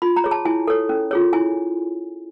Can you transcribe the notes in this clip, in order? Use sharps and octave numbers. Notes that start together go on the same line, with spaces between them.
F4 B5
A#5
G#4 C#5
A5
E4 G#5
A4 C#5
C#4
F4 G#4 C#5
E4 G#5